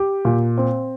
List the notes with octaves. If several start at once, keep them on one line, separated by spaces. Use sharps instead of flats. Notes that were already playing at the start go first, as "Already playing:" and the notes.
Already playing: G4
A#2
C4